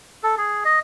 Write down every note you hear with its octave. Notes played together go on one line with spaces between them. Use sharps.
A4
G#4
D#5